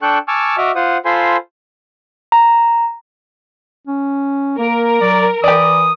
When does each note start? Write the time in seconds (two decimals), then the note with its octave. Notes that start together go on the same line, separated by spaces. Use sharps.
0.02 D4 A4 G5 C#6 F#6
0.28 G#5 A5 C#6 D6 E6 F6
0.58 F#4 D#5 E5 D6 F6
0.76 F4 C5 F#5 D#6
1.05 F4 A4 C5 G#5 B5 C6
2.32 A#5
3.87 C#4
4.59 A#3 A#4
5.01 F#3 D5
5.44 E3 G4 D5 D#6